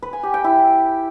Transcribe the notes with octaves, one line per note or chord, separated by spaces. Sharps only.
B4
G#5
G4
G5
E4